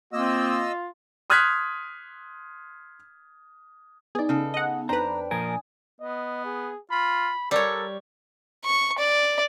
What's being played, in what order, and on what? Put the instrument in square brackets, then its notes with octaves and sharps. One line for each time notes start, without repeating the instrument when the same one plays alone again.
[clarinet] A#3 [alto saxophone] C4 [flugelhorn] F4 [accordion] D#5 E6
[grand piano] C6 D#6 F6 F#6 G#6 B6
[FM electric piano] B3 D#4 [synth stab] G#4 D5
[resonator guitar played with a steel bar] C#3 A4
[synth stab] D#5 F#5
[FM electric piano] F2 G5 [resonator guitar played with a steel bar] D4 [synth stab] B4 C5 [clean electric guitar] A#5
[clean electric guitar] A#2 F3 A#4 [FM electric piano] G#5 D#6
[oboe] B3 [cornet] D#5
[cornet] G#4
[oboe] F4 [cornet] B5
[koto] G3 C#5 [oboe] A4 [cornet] A#4
[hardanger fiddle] C#6
D5